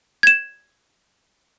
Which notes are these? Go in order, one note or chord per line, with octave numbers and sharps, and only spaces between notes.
G#6 E7